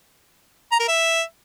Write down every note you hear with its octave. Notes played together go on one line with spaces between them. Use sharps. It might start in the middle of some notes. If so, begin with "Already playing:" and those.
A#5
A#4
E5